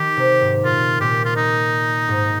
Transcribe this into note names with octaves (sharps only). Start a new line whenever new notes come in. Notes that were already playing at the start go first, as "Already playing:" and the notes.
Already playing: D#3 G4
C3
G#2
A#2 F4
A#2 G4
F4
D#4
G#2